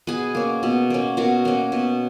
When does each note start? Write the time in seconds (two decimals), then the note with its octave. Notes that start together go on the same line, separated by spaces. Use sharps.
0.07 B2 G#4 B4
0.35 A#3 C#4
0.63 B2
0.90 A#3 C#4
1.17 B2 F#4 A#4
1.45 A#3 C#4
1.72 B2